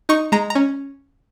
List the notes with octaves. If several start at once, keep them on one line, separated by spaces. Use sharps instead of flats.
D#4 C#6
G#3 A#5
A#5
C#4